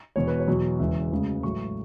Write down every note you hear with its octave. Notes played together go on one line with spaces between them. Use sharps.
E1 E2 B2 C#5
B4
C#5
E2 B2 F#3
E1 E2 C#3 E5
E1 D2 C#3 G#3
A1 A2 F#3 A3 C#6